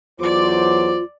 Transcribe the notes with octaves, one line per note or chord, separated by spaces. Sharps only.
E2 F#3 F4 C5 D5 D6